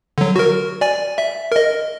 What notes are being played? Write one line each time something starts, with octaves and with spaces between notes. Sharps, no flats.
D3 F#3
F#4 A#4
D5 G#5
E5
A#4 D#5